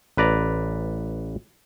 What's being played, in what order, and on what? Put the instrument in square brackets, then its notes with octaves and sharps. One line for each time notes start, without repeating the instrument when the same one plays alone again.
[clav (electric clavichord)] A1 B4 D5 A#5